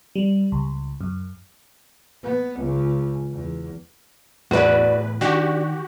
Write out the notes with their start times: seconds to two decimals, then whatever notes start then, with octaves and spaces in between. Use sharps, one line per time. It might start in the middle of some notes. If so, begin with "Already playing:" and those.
0.15 G3
0.52 C#2
1.01 F#2
2.23 B3
2.60 C#2
3.32 E2
4.51 E2 A2 F#4 B4 D5
5.21 D#3 D4 F#4 G4